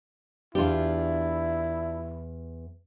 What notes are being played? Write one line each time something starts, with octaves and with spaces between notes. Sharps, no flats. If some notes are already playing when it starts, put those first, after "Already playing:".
E2 D4 E4 F4 G4